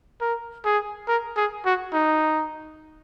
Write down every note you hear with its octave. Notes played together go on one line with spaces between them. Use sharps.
A#4
G#4
A#4
G#4
F#4
D#4